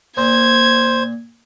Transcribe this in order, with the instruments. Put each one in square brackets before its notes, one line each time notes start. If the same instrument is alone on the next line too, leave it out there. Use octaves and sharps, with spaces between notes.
[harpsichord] A#2 [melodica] C5 [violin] G#6